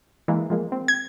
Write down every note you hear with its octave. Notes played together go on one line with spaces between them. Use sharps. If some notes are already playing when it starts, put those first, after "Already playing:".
E3 G#3 A#3
F3 G#3 A#3
C4
G#6